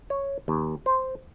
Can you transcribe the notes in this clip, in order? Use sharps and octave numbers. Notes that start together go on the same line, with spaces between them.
C#5
D#2
C5